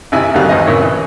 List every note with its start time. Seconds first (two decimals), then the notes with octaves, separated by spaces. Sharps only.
0.12 G#1 C3 E4 G#5
0.34 D2 D#3 F#3 G3 F5
0.49 D#2 E3 C4 D#5
0.67 A#2 A#3 C#4 E4 C#5
0.82 E3